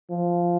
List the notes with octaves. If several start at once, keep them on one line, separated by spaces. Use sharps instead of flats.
F3